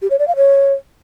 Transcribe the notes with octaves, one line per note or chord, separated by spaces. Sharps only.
G4
C#5
D5
F5
C#5